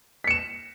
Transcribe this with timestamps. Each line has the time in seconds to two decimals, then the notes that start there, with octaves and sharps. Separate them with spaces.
0.24 B6
0.27 C#7
0.30 E7